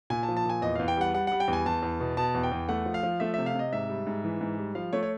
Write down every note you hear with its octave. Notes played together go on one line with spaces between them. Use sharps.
A#2 G#5
A5
F3
A5
A#2 G#5
E2 D#5
E2 F5
G5
G3 F#5
G3 F#5
G3 F#5
G5
E2
G#5
E2 A5
E2
B2
B2 A5
E2
G5
E2
A3 F#5
F3
F5
F3
A3 E5
C3 E5
F5
C3 D#5
G#2 E5
G3
G#2
E3
G#2
G3
F3 F5
A3 C#5
C#5